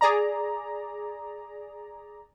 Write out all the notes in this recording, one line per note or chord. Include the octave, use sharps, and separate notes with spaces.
G#4 D5 A#5